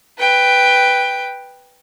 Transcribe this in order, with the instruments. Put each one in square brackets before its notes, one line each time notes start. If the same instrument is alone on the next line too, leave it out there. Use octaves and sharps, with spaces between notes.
[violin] B4 G5